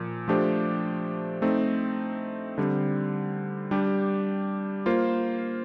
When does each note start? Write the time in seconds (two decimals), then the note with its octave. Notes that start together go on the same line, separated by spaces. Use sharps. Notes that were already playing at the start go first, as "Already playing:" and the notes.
Already playing: A#2 F3
0.28 F3 A3 D4 G4 C5
1.42 A3 C4 D#4
2.58 D3 G3 C4
3.71 G3 D4 G4
4.86 A#3 F4 C5